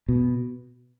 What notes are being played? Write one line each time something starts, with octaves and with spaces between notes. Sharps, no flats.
B2